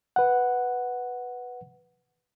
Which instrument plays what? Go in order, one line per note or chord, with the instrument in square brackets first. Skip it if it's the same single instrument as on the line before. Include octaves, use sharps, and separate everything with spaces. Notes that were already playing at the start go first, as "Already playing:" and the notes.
[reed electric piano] B4 F#5